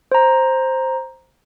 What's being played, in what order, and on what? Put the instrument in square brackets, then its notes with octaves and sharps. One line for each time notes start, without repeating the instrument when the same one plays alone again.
[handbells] C5 A#5